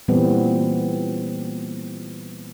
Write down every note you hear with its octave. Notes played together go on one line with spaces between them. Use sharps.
A#2 E3 G3 B3 C4